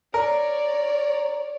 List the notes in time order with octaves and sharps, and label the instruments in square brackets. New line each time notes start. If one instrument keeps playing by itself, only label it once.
[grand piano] A#4 [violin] C#5 D5